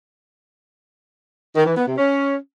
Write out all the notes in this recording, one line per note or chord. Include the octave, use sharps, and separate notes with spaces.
D#3
E3
B3
C3
C#4